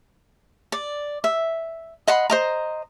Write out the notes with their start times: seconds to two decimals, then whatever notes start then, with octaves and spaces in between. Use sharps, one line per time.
0.72 D5
1.24 E5
2.08 D#5 F#5 B5 C6
2.30 C5 D#5 A#5